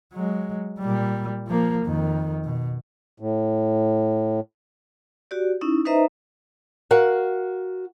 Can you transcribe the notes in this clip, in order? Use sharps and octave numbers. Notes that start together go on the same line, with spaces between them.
F#3 G#3
A#2 G3
F3 A#3
F2 D#3
B2
A2
F#4 G4 D5
C#4 D#4 E4
D#4 B4 C5 D#5 E5 A#5
F#4 A#4 F5 F#5